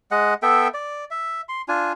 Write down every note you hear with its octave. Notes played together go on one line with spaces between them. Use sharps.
G#3 D#5 F#5
B3 A4 E5 G5
D5
E5
C6
D4 F4 G#5